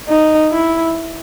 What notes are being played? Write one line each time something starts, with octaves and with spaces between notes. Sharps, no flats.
D#4
E4